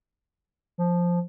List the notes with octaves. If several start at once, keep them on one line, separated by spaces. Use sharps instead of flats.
F3